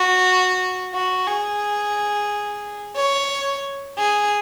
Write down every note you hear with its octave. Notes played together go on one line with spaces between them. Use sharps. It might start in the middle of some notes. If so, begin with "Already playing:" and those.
Already playing: F#4
F#4
G#4
C#5
G#4